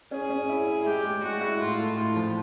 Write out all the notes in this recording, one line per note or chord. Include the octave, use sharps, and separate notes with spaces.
C#4 G#4
C#4
E4
E4
G#3 G4
G#3
G#3 F#4
E4
A2 F4
A3
A2 F4
F3